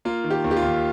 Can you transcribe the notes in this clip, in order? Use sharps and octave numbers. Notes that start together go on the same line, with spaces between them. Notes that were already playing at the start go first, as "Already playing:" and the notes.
A#3 F4
D#3
G4
D#2
G4
F4
D#2